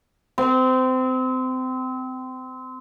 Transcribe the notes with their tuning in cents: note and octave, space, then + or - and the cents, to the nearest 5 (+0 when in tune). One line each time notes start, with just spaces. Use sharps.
C4 -25